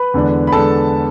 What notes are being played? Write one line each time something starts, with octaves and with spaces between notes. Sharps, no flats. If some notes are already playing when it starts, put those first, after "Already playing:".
Already playing: B4 B5
E2 D3 G#3 B3 D4
B5
D3 G#3 B3 D4 A4 A5